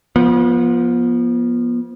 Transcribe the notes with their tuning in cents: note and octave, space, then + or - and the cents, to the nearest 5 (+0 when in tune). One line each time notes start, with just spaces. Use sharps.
F3 +0 B3 -40